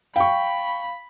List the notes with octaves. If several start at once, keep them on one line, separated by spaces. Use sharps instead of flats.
F5 G5 B5 C#6